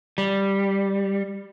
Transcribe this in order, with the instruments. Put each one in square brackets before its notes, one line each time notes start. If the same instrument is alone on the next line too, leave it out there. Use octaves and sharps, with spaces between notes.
[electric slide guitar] G3